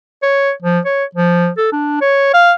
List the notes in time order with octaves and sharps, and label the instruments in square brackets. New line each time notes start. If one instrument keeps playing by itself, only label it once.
[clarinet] C#5
F3
C#5
F3
A4
D4
C#5
F5